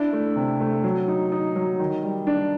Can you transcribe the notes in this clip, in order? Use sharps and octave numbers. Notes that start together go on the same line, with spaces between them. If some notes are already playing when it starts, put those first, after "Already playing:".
Already playing: D4 E4
A3
C3
A3
F#3
D#4
D#4
F#3
D#3
G3
D4